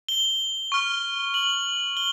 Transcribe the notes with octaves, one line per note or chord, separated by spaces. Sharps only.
G7
C#6 F6
F#7
G7